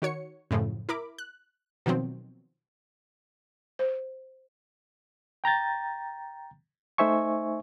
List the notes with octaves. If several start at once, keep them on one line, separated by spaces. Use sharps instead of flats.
D#3 F#4 C#5 C#7
F#2 A2 C#3 F3
E4 A#4 B5 D6
F#6
B2 D#3 F3 F#3 C4
C5
G5 A#5 G6 A6
A3 D#4 C5 E5 G#5 C#6